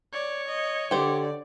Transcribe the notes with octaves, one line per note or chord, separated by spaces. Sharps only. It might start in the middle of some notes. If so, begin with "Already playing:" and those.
C#5 D5
D#5
D3 G4 C5 D5